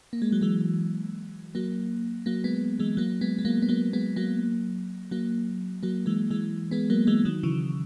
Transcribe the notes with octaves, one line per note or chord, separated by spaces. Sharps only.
A#3
G#3
F#3
E3 G#3
F#3 A#3
F#3 A#3
G#3 B3
E3 G#3
F#3 A#3
G#3 B3
G#3
F#3 A#3
B3
F#3 A#3
G#3 B3
F#3 A#3
F#3 A#3
F#3 A#3
E3 G#3
E3 G#3
G#3 B3
F#3 A#3
E3 G#3
D#3 F#3
C#3 E3